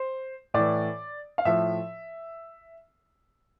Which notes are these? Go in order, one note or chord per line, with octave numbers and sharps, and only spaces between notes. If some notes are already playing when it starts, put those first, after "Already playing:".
Already playing: C5
A2 E3 D5
F5
A2 F3 E5